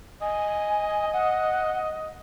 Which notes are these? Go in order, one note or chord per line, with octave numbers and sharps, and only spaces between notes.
D#5 G#5
F#5